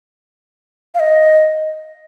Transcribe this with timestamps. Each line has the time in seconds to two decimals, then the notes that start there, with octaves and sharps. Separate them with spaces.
0.95 F5
1.00 D#5